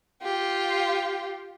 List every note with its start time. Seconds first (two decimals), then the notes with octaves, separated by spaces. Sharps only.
0.22 F4 G4